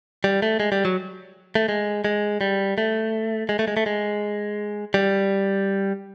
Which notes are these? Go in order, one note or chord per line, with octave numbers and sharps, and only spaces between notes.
G3
A3
G#3
G3
F#3
A3
G#3
G#3
G3
A3
G#3
A3
G#3
A3
G#3
G3